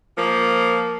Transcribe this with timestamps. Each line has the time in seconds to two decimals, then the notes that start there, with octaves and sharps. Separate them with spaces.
0.17 F3 A#3